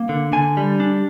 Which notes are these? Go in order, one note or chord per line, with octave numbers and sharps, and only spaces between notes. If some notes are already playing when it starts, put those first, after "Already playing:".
Already playing: A#3
D3
D3 G#5
G3
D4